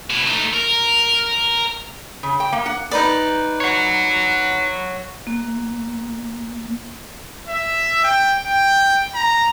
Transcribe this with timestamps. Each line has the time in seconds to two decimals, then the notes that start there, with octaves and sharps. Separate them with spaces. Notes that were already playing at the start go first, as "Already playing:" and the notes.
0.10 B2 E4
0.26 A3 D#4
0.53 A#4
2.23 C#3
2.40 G5
2.52 A#3
2.66 F#5
2.91 D#4 B4 D5
3.60 C#5 F#5
5.27 A#3
7.48 E5
8.04 G5
8.46 G5
9.15 A#5